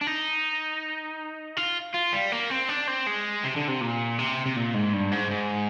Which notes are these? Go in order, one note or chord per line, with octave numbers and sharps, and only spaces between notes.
D4
D#4
F4
F4
G3
A#3
C4
D4
C4
G#3
C3
D3
C3
A#2
C3
C3
A#2
G#2
G2
G#2
G#2